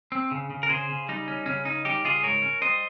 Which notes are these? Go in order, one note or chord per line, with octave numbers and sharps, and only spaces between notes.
C4
C#3
C#3
A#4
C#3 G#4 C5
C#3
G3 D#4
C#4
C#3 C#4
C#4 D#4
G3 D#4 G4
C#3 F4 G#4
G#2 A#4 C#5
C#4
G3 C5 D#5